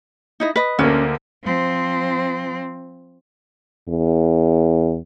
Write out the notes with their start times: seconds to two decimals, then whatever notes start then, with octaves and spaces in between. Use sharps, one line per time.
0.40 D#4 E4 D#5
0.56 B4 D#5
0.79 D2 D3 A#3 C#4
1.44 F3 C4
3.89 E2